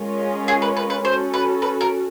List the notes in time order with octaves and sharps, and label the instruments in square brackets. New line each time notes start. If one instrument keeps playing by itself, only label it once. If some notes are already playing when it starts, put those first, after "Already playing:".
Already playing: [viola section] G#3 C#4 F4 A#4 C#5
[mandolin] G#4
B4
B4
B4
[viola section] C#4 F#4 A4 [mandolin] C5
[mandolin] B4
B4
A#4